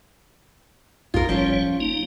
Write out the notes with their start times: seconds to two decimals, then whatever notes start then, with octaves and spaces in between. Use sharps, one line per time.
1.14 B1 F2 G#2 F4 A#4
1.29 G1 F3 G3 C#4 F4 C#5
1.80 A#3 D#4